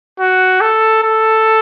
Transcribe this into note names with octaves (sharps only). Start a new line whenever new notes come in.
F#4
A4
A4